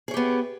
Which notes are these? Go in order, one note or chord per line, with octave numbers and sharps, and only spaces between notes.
B3 G4 G#4 C#5